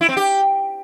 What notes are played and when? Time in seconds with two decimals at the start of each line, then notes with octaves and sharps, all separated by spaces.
0.01 E4
0.09 C4
0.17 G4